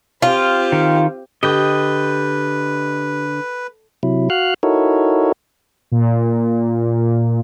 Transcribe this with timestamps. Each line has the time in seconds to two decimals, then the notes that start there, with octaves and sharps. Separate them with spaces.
0.22 C4 F4 G4
0.72 D#3
1.43 D3 G4 B4 D#5 G5
4.03 C3 F#3 E4
4.30 F#4 F5 F6 F#6
4.63 D#4 E4 F#4 A4 A#4 C#5
5.92 A#2